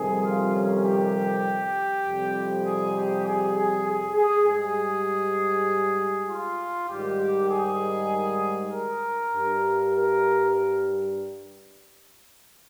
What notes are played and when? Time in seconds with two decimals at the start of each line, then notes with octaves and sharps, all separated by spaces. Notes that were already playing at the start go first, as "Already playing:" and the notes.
Already playing: F2 C3 D#3 G3 G#4
0.23 F4
0.54 C#4
0.84 G4
2.05 F2 C3 G3
2.65 G#4
2.95 G4
3.26 G#4
3.56 G#4
3.86 G#4
4.16 G#4
4.46 G#2 G3 G#4
6.27 F4
6.88 G#2 D#3 G3 G4
7.49 G#4
8.69 A#4
9.30 G2 G3
9.91 A#4